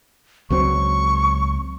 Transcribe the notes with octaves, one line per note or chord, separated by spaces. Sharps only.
C#2 F#3 C4 C#6